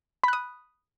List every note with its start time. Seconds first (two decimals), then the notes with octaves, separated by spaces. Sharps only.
0.24 B5
0.28 F#6
0.33 D#6